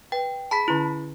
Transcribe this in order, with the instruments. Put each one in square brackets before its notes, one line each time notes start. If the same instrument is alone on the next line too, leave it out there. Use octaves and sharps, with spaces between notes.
[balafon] B4 [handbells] G5
[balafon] G#4 [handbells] A5 B5 B6
[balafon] D3 C#4 A#5 [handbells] E4